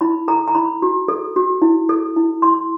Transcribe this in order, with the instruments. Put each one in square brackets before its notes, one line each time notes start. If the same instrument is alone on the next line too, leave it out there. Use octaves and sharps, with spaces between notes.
[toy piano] E4 B5
A4 A#5
A#5
E4 B5
F#4
A4
F#4
E4
A4
E4
E4 C6